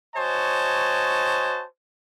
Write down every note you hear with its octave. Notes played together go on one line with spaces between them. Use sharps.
F#4 C5 C#5 D#5 G#5 A5